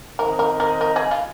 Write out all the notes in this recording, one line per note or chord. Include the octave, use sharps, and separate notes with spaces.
D#3 C4 D#4 A#4 C5 D#5
A#4
A#4
A#4
G#4
F4